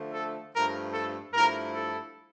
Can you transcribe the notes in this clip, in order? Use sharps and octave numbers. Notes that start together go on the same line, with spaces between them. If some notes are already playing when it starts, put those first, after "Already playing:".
Already playing: D3 F3 A3
A4
G2 F3 A3 A#4
A4
G2 F3 A3 E4 A#4
A4